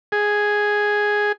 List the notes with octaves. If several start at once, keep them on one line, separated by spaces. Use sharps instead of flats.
G#4